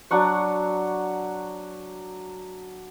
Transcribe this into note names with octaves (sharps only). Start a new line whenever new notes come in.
F#3 D4 F#5 C#6